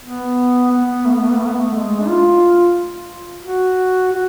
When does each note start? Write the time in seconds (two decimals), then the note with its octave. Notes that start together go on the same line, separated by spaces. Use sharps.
0.04 B3
0.72 B3
1.05 A3
1.14 B3
1.22 A3
1.31 B3
1.38 A3
1.47 B3
1.55 A3
1.74 G#3
2.00 D4
2.08 F4
3.44 F#4
4.12 F#4